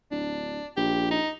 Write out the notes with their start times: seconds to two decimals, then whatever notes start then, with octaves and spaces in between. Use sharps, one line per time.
0.11 D1 D4
0.77 A#1 G4
1.11 D#4